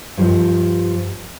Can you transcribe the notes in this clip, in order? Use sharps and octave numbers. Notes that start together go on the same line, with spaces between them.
G2 F3